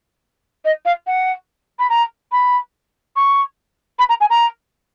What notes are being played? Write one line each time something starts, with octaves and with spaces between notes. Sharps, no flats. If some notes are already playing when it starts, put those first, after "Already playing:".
D#5
F5
F#5
B5
A#5
B5
C#6
B5
A#5
G#5
A#5